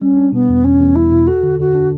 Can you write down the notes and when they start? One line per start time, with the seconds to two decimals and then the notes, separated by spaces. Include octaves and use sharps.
0.01 G3 C#4
0.17 D4
0.33 B2 B3
0.49 E2
0.64 E2 C#4
0.80 E2
0.95 E2 E4
1.11 B2
1.27 F#4 A4
1.43 D3
1.60 D3 F#4
1.75 D4